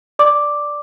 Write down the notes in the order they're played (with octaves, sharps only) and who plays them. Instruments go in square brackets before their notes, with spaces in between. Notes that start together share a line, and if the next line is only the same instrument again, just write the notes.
[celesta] D5 D6